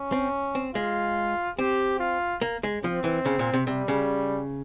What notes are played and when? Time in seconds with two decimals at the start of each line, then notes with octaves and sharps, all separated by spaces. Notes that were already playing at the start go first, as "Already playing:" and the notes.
Already playing: C#4
0.12 C4
0.55 C4
0.75 G#3 F4
1.59 C4 G4
2.00 F4
2.41 A#3
2.63 G#3
2.84 F3 C4
3.04 E3
3.25 C#3
3.39 A#2
3.53 C3
3.67 C3 G3
3.88 C#3